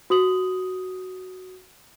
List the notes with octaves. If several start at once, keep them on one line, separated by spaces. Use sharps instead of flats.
F#4 D#6 F#7